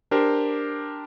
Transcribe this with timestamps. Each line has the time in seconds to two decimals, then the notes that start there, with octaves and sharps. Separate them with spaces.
0.11 D4 G4 A#4 C5